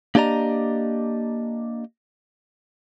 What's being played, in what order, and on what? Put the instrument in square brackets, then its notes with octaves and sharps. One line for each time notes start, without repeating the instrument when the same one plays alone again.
[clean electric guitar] A#3 D4 G4 D5 D#5 A#5